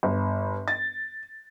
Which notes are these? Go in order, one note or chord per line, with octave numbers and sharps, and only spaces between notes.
G1
A6